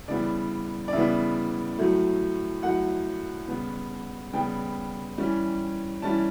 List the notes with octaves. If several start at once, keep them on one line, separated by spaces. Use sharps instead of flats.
C#3 E3 G3 B3 D5
D5
C#3 E3 G3 B3 E5
A2 F#3 A3
A2 F#3 A3 F#5
C#3 G3 B3
C#3 G3 B3 G5
E3 G3 C#4
E3 G3 C#4 A5